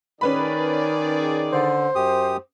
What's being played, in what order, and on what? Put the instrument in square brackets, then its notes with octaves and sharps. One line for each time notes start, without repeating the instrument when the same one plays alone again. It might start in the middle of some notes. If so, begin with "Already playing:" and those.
[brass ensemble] D#3 G#4 D5 [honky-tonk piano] C#4 B4 B5
[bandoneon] D3 [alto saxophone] C5
[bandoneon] F#2 G4 D#6